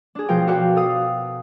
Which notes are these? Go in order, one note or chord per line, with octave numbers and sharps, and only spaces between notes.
D4 G#4
B2 F3 F4 A#4 G5 A#5
F#4 A4 B4 D5 F5 G5
A4 F5 D#6